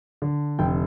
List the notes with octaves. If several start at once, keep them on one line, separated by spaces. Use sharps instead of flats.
D3
F1 G5